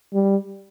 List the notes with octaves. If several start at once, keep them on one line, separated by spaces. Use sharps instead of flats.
G3